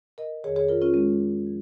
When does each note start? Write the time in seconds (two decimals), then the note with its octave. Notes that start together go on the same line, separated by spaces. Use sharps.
0.18 A#4 D#5
0.44 F2 D#3 G#4 C#5
0.56 G#4 C#5
0.69 F4 A#4
0.82 C#4 F4
0.94 G#3 C#4
1.46 F3